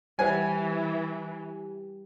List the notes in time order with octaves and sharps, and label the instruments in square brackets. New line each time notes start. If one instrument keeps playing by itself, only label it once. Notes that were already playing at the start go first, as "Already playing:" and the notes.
[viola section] E3 [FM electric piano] G3 G4 [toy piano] B4 C5 F#5 [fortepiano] G#5